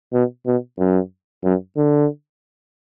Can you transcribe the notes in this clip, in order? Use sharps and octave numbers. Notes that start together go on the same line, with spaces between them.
B2
B2
F#2
F#2
D3